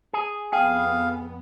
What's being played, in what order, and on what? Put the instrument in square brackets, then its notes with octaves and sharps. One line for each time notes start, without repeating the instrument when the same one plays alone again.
[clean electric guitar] G#4
[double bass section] F2 B3 [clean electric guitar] G#4 [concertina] F5 [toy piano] G5